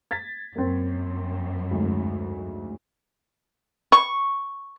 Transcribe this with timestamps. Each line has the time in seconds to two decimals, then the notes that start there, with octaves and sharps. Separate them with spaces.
0.11 G#6 A6 B6
0.56 F#2 A#3 C4
1.71 D2 G#2
3.92 C#6